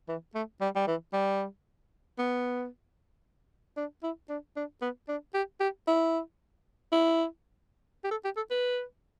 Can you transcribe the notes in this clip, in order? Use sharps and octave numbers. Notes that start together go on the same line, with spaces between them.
E3
A3
G3
G3
E3
G3
B3
D4
E4
D4
D4
B3
D4
G4
G4
E4
E4
G4
A4
G4
A4
B4